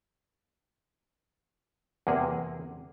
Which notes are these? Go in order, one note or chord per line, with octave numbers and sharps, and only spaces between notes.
E2 C3 A#3 G#4